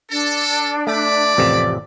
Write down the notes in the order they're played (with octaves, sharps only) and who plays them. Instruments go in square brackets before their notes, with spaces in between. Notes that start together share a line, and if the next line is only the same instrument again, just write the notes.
[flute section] D4 [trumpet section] A4
[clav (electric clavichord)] A3 [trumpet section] E4 B5 D6 [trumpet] D5
[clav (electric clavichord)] A1 F2 C3